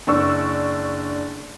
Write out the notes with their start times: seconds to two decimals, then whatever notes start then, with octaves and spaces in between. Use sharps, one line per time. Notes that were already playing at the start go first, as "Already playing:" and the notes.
0.07 F#1 D4 C#6 E6